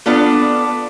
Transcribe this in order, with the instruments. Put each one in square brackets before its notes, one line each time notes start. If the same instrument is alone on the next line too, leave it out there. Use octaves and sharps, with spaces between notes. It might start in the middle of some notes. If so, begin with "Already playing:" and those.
[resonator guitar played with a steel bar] B3 D4 F4 A4